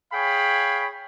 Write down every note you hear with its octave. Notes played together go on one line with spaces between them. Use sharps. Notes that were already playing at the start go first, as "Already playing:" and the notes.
G#4 C#5 F5 G5 B5